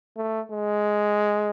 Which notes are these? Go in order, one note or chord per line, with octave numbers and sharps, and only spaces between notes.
A3
G#3